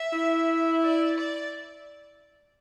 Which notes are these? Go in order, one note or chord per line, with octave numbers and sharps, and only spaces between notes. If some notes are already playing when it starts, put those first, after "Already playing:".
Already playing: E5
E4
D5
D5